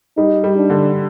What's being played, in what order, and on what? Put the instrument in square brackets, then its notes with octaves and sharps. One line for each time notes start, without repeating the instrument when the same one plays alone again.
[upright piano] G3 [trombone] D#4
[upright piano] G3
[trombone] D4
[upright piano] D3